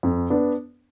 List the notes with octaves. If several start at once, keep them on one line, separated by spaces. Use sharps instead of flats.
F2
B3 D4